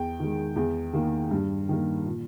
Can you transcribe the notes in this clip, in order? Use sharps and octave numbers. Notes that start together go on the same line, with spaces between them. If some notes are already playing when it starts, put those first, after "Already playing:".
Already playing: E2 G5
D#3 G#3
E2
D#3 A#3
G2
D#3 A#3
A#2